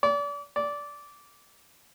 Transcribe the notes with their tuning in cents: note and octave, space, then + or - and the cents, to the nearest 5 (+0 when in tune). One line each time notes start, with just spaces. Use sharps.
D5 -35
D5 -15